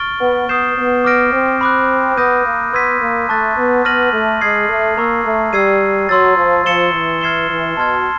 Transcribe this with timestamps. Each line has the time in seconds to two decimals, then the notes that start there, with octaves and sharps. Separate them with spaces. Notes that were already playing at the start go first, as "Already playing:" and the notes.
Already playing: C#6 F6 A6 D7 G7
0.21 B3
0.49 B3 D#6 G6 C7 E7
0.77 B3
1.05 D6 F6 A#6 D7
1.33 C4
1.61 B5 D6 F#6
2.17 B3 D#6 G6 A#6 D#7
2.45 A#3
2.73 B3 C6 E6 G#6 B6 D#7
3.01 A#3
3.29 A3 A5 C#6 F#6 A6
3.57 B3
3.85 B3 F6 A#6 D#7 F#7
4.13 A3
4.41 G#3 D#6 G#6 C7
4.69 A3
4.98 A#3 A#5 C#6 E6
5.25 A3
5.53 G3 E6 G#6 C7 D#7
6.09 F#3 C6 E6 A6
6.37 F3
6.65 F3 E6 A6 C#7 E7 G7
6.94 E3
7.21 F6 G#6 C7 E7 G7
7.50 E3
7.77 B2 A5 C6 F6 G#6